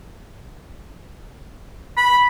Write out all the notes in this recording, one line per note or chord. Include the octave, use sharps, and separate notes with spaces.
B5